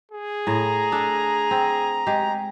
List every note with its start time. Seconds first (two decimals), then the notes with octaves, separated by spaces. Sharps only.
0.11 G#4
0.47 A2 A#5
0.92 D4 A4
1.51 C4
2.06 G#3 G4